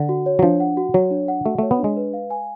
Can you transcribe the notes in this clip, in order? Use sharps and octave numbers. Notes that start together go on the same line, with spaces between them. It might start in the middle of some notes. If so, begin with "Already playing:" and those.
Already playing: D3 F#5
F#4
C#5
F#3
F3 D4
F#5
F#4
F#3 C#5
D4
F#5
A3 F#4
A3 C#5
B3
D4
G#3
B4
F5
G#5